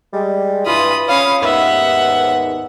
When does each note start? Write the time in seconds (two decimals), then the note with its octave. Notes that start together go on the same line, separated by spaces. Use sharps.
0.13 G3 G#3
0.66 G2 E3 F4 B5 D#6
1.08 C#4 F4 C#5 F5 B5 D#6
1.42 D#2 G#2 B3 E5 F#5